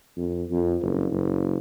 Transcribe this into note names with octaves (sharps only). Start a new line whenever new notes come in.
F2
F2
F#1
F#1